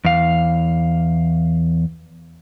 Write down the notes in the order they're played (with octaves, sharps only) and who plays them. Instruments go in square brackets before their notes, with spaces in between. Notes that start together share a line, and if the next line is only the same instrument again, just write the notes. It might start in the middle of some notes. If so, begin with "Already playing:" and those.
[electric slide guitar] E2 F5